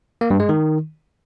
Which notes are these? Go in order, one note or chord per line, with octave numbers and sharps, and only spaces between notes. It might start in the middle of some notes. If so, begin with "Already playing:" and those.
A#3
G2
G#3
D#3